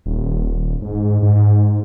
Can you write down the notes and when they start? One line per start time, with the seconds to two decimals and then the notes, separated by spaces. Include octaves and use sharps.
0.06 D#1
0.82 G#2
1.22 G#2